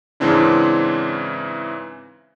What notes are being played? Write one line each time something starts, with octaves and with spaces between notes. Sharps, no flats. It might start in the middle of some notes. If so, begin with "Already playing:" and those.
G#2 C#3 E3 C4 D4 E4